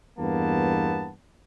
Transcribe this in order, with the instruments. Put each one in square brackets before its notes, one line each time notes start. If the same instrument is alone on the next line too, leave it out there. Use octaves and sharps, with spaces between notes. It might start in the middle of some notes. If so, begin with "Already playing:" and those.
[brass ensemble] E2 G2 A#3 B3 A5